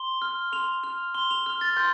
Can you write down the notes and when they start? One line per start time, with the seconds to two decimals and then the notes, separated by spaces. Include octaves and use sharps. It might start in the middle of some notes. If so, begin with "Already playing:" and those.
Already playing: C6 G7
0.22 F6
0.52 C6 F7
0.83 F6 F7
1.15 C6 G7
1.31 F7
1.46 F6
1.61 A6
1.77 C6 G6